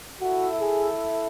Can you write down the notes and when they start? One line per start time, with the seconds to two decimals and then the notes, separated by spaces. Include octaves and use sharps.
0.21 E4 F#4 A4 E5
0.60 G#4